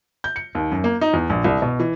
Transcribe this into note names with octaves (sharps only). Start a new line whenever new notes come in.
G6
C#7
D#2
F#2
A#3
D#4
E2
A#1
C2
B2
E3